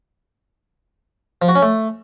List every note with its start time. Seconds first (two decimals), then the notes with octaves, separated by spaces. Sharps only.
1.42 F3
1.49 F#4
1.55 C#4
1.62 A3